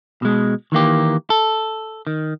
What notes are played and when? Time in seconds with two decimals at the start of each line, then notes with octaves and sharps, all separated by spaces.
0.22 B2 G#3
0.72 D#3 E3 A#3 G4
1.30 A4
2.07 D#3